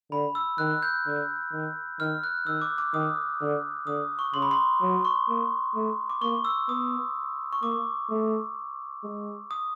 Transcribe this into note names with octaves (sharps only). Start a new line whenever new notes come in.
D3 B5
E6
D#3 F#6
G6
D3
D#3
D#3 F6
F#6
D#3 E6
D6
D6
D#3 D#6
D3
D3 D#6
C#6
C#3 C6
B5
C6
F#3
C#6
A#3
A3
D6
A#3 C#6
E6
B3 D#6
C#6
A#3 D6
A3
G#3
D#6